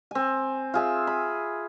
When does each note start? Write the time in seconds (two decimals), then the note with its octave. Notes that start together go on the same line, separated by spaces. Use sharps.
0.11 C4 G#5
0.74 F4 G#4 E5
1.07 B5